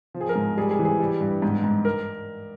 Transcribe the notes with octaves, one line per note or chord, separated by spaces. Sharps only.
F3
G#4
A#4
G#2
G3 G#4
G#4
E3
G#4
G3
G2
G#2
G#2
A#4